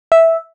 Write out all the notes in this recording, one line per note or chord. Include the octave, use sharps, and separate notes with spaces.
E5